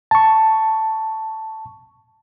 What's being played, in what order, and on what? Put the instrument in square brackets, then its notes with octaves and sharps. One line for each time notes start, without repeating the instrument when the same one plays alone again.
[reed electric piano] A5 C#6